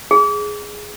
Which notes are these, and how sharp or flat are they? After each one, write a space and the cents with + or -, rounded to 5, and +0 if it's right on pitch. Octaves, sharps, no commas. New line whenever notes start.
G#4 +0